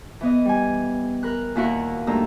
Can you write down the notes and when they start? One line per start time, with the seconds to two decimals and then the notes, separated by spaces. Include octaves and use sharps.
0.21 E3 B3 D#5
0.45 G3 G#5
1.23 A#4 B5 F#6
1.56 D#2 A#2 E4 F#4 A#4 F#5
2.07 G2 A3 A#3 D#4 A#5 E6